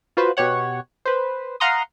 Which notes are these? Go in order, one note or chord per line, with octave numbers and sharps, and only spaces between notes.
F4 F#4 B4 C5
B2 G4 C#5 F#5
B4 C5
F5 F#5 A#5 C6 D#6